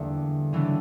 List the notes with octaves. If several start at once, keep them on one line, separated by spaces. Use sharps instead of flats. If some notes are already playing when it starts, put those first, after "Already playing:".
Already playing: E2 D3 G3 A#3
C#3 E3 G3 B3 D4